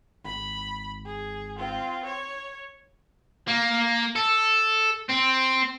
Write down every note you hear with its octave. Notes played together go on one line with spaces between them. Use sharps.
G#1 B5
G#4
C4 F4
C#5
A#3
A4
C4